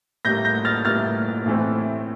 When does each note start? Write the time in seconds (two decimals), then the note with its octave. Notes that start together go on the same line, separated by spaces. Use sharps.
0.25 A2 G3 A#3 G6 A#6
0.45 G6 A#6
0.65 F6 A6
0.85 A2 G3 A#3 F6 A6
1.46 A2 E3 A3 C4